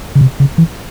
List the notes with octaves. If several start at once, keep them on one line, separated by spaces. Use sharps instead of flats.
C#3
C3
C#3
E3